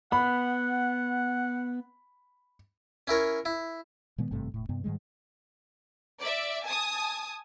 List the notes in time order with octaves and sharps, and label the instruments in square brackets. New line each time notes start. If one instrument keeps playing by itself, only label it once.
[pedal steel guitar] B3 [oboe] F#5 [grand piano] B5
[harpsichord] C#4 E4 A#4 C#5
E4
[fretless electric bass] A#2 D#3 G#3 B3
G#1 G2 C3 A3
E1 A2
G2 C3 B3
G#2 D#3 G3 G#3
[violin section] D5 E5
G#5 A5 D#6